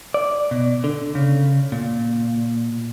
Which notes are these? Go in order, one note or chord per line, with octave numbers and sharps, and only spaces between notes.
D5
B2
D3
C#3
A#2